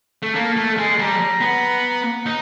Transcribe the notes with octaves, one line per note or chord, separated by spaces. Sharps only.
A3
A#3 A5
A3
G#3
G3 A#5
B3
D#4